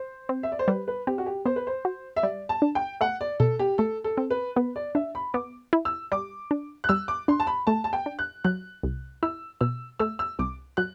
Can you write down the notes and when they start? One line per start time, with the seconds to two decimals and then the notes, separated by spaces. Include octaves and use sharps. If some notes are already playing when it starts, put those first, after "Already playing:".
Already playing: C5
0.29 C4
0.43 E5
0.52 D5
0.59 C5
0.68 G3 B4
0.88 B4
1.07 C4 G4
1.18 F#4
1.26 G4
1.46 B3 C5
1.56 B4
1.67 C5
1.85 F#4
2.16 E5
2.23 G3 D5
2.49 A5
2.62 D4
2.75 G5
3.01 A3 F#5
3.21 D5
3.40 B2 A4
3.59 G4
3.78 A3 A4
4.04 A4
4.17 C4
4.30 B4
4.56 B3 B4
4.76 D5
4.95 D4 E5
5.15 B5
5.34 B3 D6
5.73 E4
5.85 E6
6.12 G3 D6
6.51 D4
6.84 F#6
6.89 G3 E6
7.08 D6
7.28 D4 C6
7.40 A5
7.47 B5
7.67 A3 A5
7.84 A5
7.93 G5
8.06 D4
8.19 F#6
8.44 F#3 F#6
8.83 C2
9.23 E4 E6
9.61 B2 E6
9.99 A3 E6
10.19 E6
10.39 C2 D6
10.77 F#3 F#6